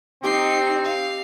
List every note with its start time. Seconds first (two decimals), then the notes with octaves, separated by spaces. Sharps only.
0.24 C4 D#4 G4 G5 D6 C7
0.84 F5